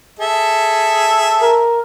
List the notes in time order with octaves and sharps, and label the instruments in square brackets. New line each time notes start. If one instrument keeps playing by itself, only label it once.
[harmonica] G#4 A4 E5
[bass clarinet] A#4